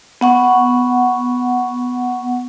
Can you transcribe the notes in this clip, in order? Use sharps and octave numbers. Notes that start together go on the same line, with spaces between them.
B3 F#5 C#6